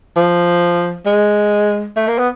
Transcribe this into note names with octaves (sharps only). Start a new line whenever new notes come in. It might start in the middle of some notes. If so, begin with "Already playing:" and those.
F3
G#3
A3
A#3
B3